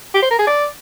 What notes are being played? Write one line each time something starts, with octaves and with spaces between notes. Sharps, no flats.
G4
C5
A#4
G#4
D5